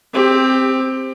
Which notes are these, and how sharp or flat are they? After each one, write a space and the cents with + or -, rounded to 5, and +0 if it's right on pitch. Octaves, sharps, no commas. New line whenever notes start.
C4 +0 G4 +20